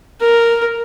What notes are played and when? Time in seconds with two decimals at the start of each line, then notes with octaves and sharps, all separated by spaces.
0.21 A#4